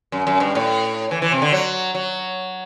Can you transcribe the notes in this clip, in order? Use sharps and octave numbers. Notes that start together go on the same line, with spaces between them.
F#2
F#2
G2
A2
E3
E3
C3
D3
F#3
F#3